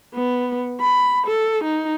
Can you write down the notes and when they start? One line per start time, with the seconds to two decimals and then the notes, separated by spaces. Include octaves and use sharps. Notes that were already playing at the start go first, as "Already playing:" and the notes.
0.14 B3
0.81 B5
1.27 A4
1.64 D#4